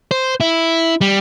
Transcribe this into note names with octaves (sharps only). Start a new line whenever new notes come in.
C5
E4
G3